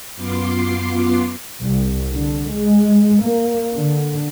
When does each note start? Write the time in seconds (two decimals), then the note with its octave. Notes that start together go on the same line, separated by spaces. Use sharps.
0.16 F#2 B3 F4 C6 D6 C7
1.62 C2
2.11 D3
2.50 G#3
3.23 A#3
3.74 D3